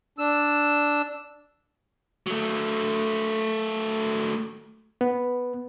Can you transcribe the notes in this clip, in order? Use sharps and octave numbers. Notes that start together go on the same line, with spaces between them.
D4 E6
F#3 A3
B3